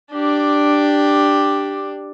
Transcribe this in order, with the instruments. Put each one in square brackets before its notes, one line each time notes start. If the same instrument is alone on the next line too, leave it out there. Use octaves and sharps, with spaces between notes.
[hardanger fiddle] D4 G4